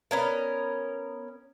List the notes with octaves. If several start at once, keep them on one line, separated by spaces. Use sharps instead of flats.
B3 C#4 A#4